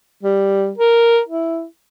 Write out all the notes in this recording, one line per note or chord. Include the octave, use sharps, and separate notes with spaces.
G3
A#4
E4